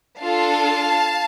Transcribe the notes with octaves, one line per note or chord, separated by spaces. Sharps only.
D4 F4 A4 F5 A5